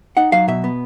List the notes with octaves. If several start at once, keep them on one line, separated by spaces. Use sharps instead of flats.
D#4 F#5
F#3 F5
B2 E5
B3